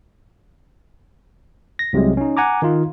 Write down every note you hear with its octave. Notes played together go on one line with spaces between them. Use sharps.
A#6
C2 C3 F#3 G#3
C#4 D#4
F#5 G#5 A#5 D6
D#3 D#4 F4